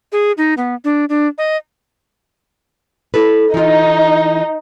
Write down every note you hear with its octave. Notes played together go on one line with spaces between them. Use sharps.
G#4
D#4
B3
D4
D4
D#5
E4 A4 B4
E3 D#4 F4